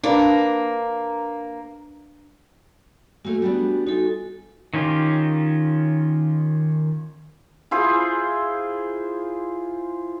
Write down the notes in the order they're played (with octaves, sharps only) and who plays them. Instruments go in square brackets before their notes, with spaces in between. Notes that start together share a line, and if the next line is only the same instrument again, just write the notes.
[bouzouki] A#3 [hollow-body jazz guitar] D4 B4
[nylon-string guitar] A3 A#3 [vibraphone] F#4 G#5
[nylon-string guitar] G3 B3 D4
[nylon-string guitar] D#4 F4 [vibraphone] F#4 A4 G#5
[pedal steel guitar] D#3 C#4 F4 G4
[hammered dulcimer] E4 F4 G#4 C5